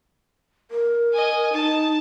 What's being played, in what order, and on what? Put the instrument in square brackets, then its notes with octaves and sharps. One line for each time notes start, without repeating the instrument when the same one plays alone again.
[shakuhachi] A#4
[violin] D#5 G#5
[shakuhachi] D#4 [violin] A5